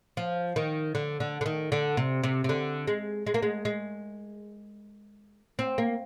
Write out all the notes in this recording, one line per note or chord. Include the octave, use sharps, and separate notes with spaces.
F3
D#3
D3
D3
D3
D#3
D3
C3
C3
C3
D3
G#3
G#3
A#3
G#3
G#3
C4
A#3